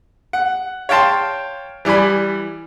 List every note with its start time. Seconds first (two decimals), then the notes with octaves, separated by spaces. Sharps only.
0.33 F#5
0.89 C#5 F5 G5 A5 C6
1.85 E3 G3 D5 G#5 B5